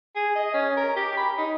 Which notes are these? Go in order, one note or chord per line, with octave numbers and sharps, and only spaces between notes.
G#4
D#5
C#4
A#4
G4
B5
D#4